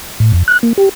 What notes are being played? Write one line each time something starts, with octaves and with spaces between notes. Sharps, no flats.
A2
F2
F#6
A#3
G4